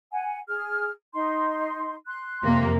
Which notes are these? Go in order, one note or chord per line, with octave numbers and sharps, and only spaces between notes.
F#5 G#5
G#4 F6
D#4 C6
C6 F#6
F2 C3 A#3